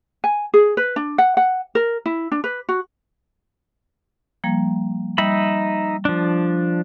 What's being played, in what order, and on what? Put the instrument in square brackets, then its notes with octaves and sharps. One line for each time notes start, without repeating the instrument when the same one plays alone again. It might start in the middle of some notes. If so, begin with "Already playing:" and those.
[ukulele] G#5
G#4
B4
D4
F#5
F#5
A#4
E4
D4
B4
F#4
[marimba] F3 G3 A#3
[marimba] G3 [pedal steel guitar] D#4 E5 B5
[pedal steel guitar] F3 D4